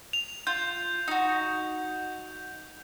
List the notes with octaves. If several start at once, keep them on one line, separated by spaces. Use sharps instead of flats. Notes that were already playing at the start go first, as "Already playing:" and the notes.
F7
F4 G6
D#4 F#4